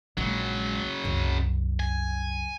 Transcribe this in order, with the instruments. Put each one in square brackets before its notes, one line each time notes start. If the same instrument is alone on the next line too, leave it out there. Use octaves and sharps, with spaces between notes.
[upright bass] A#1 G#3 [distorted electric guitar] C#3 F#3
[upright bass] C2 F#2
[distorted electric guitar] G#5